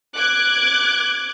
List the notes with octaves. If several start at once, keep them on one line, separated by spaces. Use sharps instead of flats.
D6 F#6 G#6